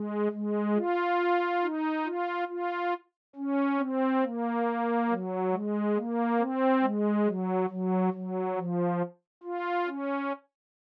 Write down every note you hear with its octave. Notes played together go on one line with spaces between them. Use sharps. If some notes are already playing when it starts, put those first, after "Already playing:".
Already playing: G#3
G#3
F4
D#4
F4
F4
C#4
C4
A#3
F#3
G#3
A#3
C4
G#3
F#3
F#3
F#3
F3
F4
C#4